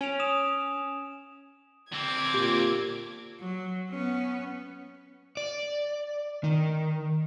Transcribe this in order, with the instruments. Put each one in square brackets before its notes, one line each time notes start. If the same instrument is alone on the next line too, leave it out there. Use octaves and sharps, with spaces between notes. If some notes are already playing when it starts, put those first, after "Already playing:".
[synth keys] C#4 [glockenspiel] G#5 D7 F7
[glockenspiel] D#6 E7 F7
[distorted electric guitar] D3 C4 [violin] D6 G#6
[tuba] A#2 [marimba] G4
[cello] F#3
B3 C#4
[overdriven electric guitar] D5
D#3